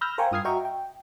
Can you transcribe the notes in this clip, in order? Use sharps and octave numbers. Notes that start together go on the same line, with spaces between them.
B5 E6 F6 G6 A#6
A#4 C5 F5 G5 G#5 C#6
G2 F4 D#6 F6 G#6 C7
F#4 D#5 E5 G5 A#5 C#6
G5